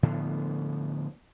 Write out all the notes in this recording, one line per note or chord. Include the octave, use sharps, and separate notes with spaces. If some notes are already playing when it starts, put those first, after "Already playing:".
A2 D3 F3 B3